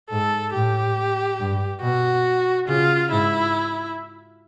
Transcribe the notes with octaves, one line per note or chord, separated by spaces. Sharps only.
G#2 A4
A2 G4
G2
B2 F#4
C#3 F4
G#2 E4